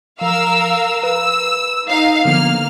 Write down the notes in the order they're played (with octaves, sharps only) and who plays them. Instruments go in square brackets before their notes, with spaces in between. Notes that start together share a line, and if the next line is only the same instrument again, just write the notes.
[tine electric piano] F3 [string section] A#4 F5 E6
[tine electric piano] B4 [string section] E6
[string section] D#4 F5
[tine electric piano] D3 F3 B3 [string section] A#3 F6